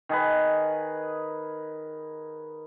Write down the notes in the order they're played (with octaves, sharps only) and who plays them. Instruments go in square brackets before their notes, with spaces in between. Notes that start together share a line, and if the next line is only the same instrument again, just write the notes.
[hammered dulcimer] D#3 G#4 B4